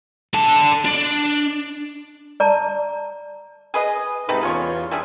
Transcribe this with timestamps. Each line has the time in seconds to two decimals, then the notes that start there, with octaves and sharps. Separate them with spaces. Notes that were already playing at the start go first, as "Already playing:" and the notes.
0.34 D3 A5
0.85 D4
2.40 D5 A5 A#5
3.74 G#4 B4 D#5
4.29 G#2 C3 C4 D#4 A4 B4
4.43 E2 C#4 F4 C#5 C#6
4.91 G3 D4 G#4 E5 G#5